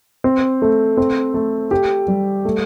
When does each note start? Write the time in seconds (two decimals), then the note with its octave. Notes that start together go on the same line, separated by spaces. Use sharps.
0.24 C4
0.62 A3
0.97 C4
1.34 A3
1.71 G4
2.08 G3
2.45 A3